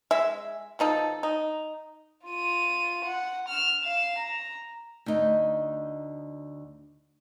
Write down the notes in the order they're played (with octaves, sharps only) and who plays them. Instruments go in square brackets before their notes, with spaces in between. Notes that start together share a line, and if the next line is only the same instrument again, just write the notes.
[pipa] G#3 E5
B2 F3 D#4 A4
D#4
[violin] F4 D#7
F#5
F6 E7
F5 E7
A#5
[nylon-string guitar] D2 D#4